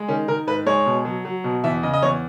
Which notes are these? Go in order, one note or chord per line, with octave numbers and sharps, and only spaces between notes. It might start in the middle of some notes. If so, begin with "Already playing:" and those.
Already playing: G#3
D#3 C#4
D#3 A#4
G#2 B4
G#3 C#5
B2
F#3
F#3
B2
E2 E5
C#3 D#5
D#5
E2 C#5